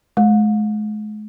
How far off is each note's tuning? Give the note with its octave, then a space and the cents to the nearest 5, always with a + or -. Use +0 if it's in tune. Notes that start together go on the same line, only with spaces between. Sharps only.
G#3 +40